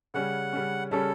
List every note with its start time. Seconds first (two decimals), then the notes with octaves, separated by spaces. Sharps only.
0.14 C#3 G3 C#4 F#5
0.53 C#3 G3 C#4
0.91 C#3 G3 C#4 A4